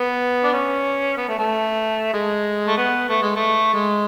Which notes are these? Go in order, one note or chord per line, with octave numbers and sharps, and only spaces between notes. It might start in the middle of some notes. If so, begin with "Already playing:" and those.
Already playing: B3
D4
C#4
B3
A3
A3
G#3
A3
B3
A3
G#3
A3
G#3